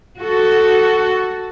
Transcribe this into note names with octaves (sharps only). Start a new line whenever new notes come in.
F#4 A4